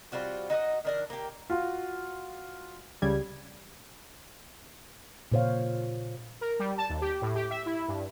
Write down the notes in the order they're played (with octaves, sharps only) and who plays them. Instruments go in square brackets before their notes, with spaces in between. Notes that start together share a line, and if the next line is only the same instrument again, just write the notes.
[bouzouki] G3 C4 F4 F#4
D#4 F#4 A#4 D#5
D#3 D4 A#4
A#3 G4
[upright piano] F4 F#4
[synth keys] C#2 G3 G#6
[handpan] A#2 C#3 C5 C#5 F5
[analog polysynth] A#4
G3
A5
D#2
G4
A2
G4
E5
E4
G2